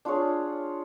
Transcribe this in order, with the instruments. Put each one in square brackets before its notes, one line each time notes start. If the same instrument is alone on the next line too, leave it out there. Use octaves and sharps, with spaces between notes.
[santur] D4 F4 G#4 C#5